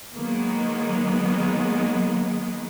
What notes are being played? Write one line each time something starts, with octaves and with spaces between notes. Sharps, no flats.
D#3 F#3 G#3 A#3 B3 D#4